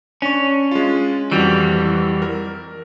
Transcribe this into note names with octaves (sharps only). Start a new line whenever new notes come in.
C#4 D4 C#6
G#3 F4
F2 E3 G3 F#4 D7
A#4